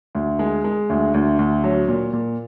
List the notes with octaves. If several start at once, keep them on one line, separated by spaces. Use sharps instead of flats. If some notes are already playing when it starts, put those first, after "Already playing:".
D2
G#3
G#3
D2
D2
D2
F#3
A#2
A#2